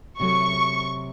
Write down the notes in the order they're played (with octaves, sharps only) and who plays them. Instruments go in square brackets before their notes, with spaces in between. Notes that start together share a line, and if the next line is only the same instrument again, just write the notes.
[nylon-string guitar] C3 F#3 A3 [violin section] C#6